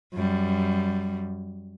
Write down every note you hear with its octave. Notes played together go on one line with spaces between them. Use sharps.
F#2 G3